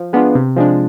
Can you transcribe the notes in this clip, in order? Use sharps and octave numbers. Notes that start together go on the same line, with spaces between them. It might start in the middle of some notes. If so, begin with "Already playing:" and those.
Already playing: F3
G#3 B3 D4 F4
C3
F3 G#3 D4